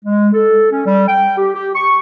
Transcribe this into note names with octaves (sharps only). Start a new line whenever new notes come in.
G#3
A4
C#4
G3
G5
G4
G4
C#6